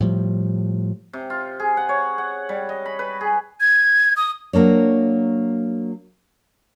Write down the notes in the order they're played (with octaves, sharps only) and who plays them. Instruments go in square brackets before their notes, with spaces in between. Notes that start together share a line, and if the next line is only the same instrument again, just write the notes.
[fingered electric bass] A2 F3 G3
[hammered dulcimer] C3
F4
G#4
F#5
C#5
F#5
G3
D#5
B5
B4
G#4
[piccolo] G#6
D#6
[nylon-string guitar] F#3 A#3 D4 C#5